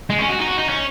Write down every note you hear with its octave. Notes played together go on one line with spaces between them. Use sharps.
G#3
C#4
F#4
D#4
F#4
D#4
C#4